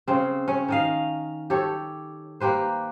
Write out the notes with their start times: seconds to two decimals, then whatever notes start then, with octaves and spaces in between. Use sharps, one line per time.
0.07 C#3 C4
0.48 C#4 C#5
0.68 D#3 D#5 F5
1.50 G4 A4 C#5
2.40 A#3 G4 B4 C5